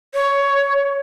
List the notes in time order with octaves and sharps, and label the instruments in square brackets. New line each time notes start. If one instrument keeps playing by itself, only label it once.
[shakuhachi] C#5